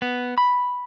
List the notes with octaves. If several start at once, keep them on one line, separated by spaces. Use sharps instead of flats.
B3
B5